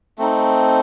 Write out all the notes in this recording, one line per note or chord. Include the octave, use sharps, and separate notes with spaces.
A3 C4 D#4